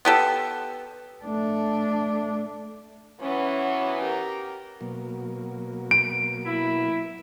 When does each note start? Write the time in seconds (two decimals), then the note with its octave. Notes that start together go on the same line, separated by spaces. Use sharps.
0.05 B3 G4 A4
1.24 A3 D4
3.20 E3 F#3 B3 C#4
4.01 G4 A#4
4.81 B2 F#3 A#3
5.91 D7
6.44 E4